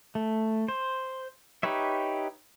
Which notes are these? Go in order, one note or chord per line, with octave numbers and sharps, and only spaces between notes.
A3
C5
D#4 G4 B4 C#5 E5